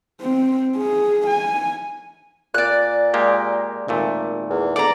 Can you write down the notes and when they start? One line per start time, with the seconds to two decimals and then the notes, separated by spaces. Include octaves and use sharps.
0.21 C4
0.77 G#4
1.27 G#5
2.54 A#2 D5 F#6
3.14 G#3 A#3 G4
3.88 G#1 A#2 A3
4.50 E2
4.76 D3 D5 A#5